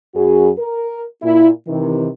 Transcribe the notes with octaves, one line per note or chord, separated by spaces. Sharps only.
F#2 F#4 G#4
A#4
A#2 E4
C3 D#3 E3